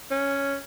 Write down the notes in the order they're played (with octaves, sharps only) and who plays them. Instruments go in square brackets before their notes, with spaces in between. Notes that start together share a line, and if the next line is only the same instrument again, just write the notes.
[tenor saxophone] C#4